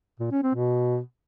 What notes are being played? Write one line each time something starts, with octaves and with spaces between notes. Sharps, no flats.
A#2
C#4
C4
B2